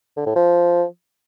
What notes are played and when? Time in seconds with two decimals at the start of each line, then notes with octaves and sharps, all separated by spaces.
0.17 D3
0.26 A2
0.36 F3